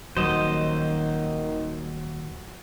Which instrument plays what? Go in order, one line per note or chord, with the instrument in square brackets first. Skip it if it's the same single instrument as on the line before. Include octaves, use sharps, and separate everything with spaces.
[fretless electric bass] D#1 [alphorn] D#3 [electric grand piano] F#3 E7 [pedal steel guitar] C5 D#5